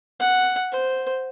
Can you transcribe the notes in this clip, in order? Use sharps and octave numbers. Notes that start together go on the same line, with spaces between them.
F#5
C5